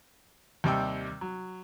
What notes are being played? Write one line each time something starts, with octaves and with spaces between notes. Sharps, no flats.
D#2 C3 G3 G5 D6 E6
F#3